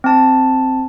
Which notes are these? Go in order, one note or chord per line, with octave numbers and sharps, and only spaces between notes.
C4 A5